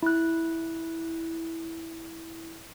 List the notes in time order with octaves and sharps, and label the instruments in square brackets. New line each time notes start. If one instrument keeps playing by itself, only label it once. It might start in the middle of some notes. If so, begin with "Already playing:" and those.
[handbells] E4 F#6